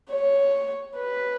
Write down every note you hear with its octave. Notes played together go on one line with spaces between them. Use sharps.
C#5
B4